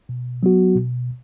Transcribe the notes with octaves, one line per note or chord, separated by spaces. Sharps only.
B2
F#3 B3 F#4
B2